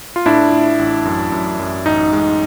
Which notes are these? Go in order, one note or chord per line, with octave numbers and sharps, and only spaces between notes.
F4
A2 D4 E4
A2
A1
F#2
F#2
F#2
A1 D#4
G#3